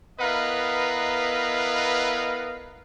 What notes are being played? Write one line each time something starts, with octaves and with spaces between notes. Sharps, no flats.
B3 E4 A#4 B4 D#5 F5